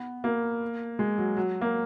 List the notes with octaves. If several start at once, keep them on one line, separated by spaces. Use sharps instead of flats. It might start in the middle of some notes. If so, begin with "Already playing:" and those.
Already playing: B3
A#3
G#3
F#3
F#3
A#3